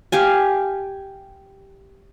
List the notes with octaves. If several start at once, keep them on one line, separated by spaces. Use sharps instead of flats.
G4 F5 G#5